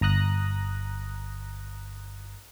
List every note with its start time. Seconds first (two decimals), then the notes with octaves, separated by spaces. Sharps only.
0.01 G1 A#5 D#6 F#6 A#6